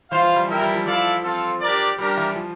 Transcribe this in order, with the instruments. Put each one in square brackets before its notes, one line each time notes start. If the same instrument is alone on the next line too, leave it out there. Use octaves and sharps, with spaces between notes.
[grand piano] E3 [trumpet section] F4 C5 F5
[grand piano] F3
G3
[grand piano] F3 [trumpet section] E4 A#4 E5 G5
[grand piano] G3
F3
[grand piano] F3 [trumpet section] E4 A4 D5 F5
[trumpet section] C4 F4 A4
D4 G4 A#4 D5
[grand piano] G3 [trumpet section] D4 G4 A#4
[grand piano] E3
F3